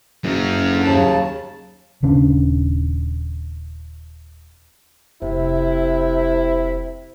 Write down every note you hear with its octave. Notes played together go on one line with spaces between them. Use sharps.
F#1 F#2 A#4
D3
D#2 C#3 A5
D#1 C#3 C#4 D4
F1 C3 E4